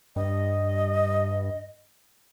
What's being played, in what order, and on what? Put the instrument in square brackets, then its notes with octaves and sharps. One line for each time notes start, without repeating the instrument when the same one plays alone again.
[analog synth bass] G2 [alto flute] D#5